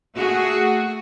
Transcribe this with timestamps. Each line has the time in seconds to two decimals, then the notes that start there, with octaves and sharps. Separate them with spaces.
0.15 A3 F#4 G#4